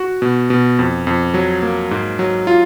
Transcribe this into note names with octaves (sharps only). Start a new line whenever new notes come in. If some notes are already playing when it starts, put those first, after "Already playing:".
Already playing: F#4
B2
B2
F2
F2
F#3
A#3
G#2
F#3
F4